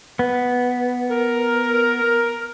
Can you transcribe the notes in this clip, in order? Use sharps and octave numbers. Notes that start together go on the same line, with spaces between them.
B3
A#4